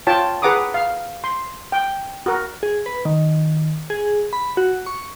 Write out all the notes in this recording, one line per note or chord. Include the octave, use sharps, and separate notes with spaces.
F4 C#5 G5 A5
G#4 B4 F#5 A#5 D6 D#6
F5
C6
G5
F#4 A#4
G#4
B4
D#3
G#4
B5
F#4
C#6